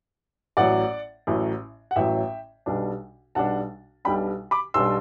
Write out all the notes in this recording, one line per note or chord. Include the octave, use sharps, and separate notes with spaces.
A1 A2 F#3 D5 F#5
A1 A2 F#3
F#5
A1 A2 F#3 E5 G5
B1 B2 G3 D4
B1 B2 G3 D4 F#5 A5
B1 B2 G3 D4 G5 B5
B5 D6
B1 B2 G3 D4 C6 E6